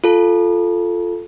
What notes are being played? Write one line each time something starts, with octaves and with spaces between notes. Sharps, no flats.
F4 A4